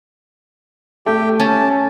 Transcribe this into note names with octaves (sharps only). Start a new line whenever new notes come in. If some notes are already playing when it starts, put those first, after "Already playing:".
A3 G4 G5
C#4 A5